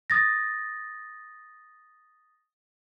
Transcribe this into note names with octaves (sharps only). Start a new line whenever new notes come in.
D#6 A6 A#6